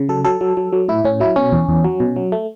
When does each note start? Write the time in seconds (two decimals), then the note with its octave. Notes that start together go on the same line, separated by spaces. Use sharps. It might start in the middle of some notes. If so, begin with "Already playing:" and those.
Already playing: C#3
0.09 F#3 A4
0.25 F#3 A4
0.41 F#3
0.57 F#3
0.72 F#3
0.88 A2 E4
1.05 A2 C#4
1.20 F#3 E4
1.36 B2 C#4
1.52 E2
1.69 E2
1.84 F#3
2.00 B2
2.16 F#3
2.32 A3